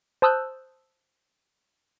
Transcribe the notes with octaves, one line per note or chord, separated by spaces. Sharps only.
C5 A5 D#6 E6 F#6 G6